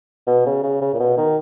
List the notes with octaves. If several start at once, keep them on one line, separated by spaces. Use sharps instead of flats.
B2
C#3
C#3
C#3
A#2
B2
D#3